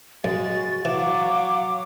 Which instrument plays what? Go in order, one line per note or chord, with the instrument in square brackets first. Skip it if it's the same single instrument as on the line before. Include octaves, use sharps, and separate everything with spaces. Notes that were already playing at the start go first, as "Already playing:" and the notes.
[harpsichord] F#2 [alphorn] G#3 [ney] F#4 [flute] A6
[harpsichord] E3 [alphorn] F#3 [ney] F5 [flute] D6